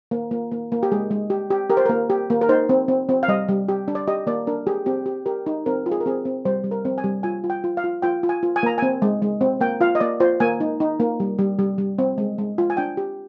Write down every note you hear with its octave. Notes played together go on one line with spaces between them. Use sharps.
A#3
A#3
A#3
A#3
G4
G#3 G#4
G#3
G4
G4
G4 A#4
C5
A#3 A#4
G4
A#3
A#4
D#4 C5
C4
C4
C4
F5
G3 D#5
G3
G4
D4
D5
G4 D#5
A#3 D5
D4 A#4
G4 G#4
C4 G4
G4
G4 A#4
D#4
C4 A#4
F4
G#4
A#4
C4 G#4
C4
G3 C5
G3
A#4
C4
G#5
G3
F4 G#5
F4
G5
F4
F5
F4
F4 G5
F4
G#5
F4
G#5
A#3 A#5
C4 G#5
G#3
G#3
C4
A#3 G5
F4 F5
D#5
A#3 D5
F4 C5
A#3 G#5
D#4
D#4
A#3
G3
G3
G3
G3
C4
G#3
G#3
F4
G#5
D4 G5
G4